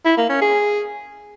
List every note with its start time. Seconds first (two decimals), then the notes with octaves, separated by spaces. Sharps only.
0.05 E4
0.17 A#3
0.29 C#4
0.41 G#4